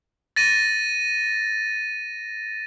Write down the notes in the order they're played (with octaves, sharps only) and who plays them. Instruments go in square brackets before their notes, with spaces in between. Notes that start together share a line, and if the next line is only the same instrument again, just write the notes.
[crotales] A6 A#6 D#7